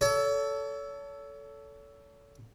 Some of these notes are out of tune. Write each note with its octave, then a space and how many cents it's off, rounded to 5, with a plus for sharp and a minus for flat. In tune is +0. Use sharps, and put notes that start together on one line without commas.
A4 +0 C#5 +35